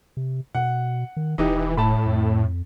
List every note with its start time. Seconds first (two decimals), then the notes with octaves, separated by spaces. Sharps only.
0.17 C3
0.55 B2 F#5
1.17 D#3
1.38 E1 E3 D#4 G4
1.77 A2 A5 B5
2.06 F2